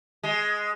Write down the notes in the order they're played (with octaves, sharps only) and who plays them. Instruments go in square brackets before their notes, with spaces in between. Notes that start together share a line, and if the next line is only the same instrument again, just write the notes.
[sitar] G#3